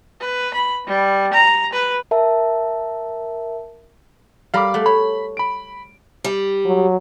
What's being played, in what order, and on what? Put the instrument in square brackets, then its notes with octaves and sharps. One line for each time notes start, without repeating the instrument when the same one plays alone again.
[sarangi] B4
B5
G3
A#5
B4
[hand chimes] A#4 E5 A5
[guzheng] G3 A#4 [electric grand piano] F5 B5 D6
[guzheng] A3 F#5
[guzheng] C#5 [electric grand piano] B5
[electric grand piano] B5 D7
[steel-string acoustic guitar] G3
[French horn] F#3